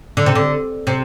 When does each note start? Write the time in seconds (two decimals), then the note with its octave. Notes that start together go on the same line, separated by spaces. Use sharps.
0.17 D3
0.26 C3
0.35 D3
0.87 C3